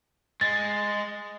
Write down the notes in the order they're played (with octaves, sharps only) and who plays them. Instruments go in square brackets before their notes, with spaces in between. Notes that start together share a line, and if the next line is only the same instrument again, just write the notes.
[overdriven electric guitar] G#3 [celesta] A6